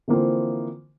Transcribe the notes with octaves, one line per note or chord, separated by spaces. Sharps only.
D3 E3 F3 A#3 C4